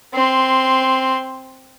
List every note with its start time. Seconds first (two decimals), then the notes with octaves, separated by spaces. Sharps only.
0.14 C4 C6